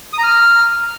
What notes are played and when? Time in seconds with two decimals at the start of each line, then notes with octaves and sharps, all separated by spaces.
0.13 D#6
0.18 A#5
0.23 F6